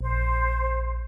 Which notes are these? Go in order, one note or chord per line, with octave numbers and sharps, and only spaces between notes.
A#1 C5